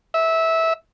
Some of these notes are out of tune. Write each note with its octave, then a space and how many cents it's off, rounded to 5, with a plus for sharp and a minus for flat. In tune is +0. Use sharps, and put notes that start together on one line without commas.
E5 -15